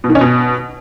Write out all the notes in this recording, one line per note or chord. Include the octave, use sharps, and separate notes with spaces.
B2
D#3
C#4
B2